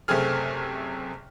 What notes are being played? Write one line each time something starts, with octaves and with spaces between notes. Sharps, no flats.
F#1 C3 A3 C4 G#4 F6